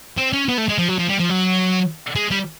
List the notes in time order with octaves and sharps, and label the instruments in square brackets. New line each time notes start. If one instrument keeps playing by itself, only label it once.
[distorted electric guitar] C4
C#4
B3
A3
G#3
F3
F#3
F3
G3
F3
F#3
G#3
G3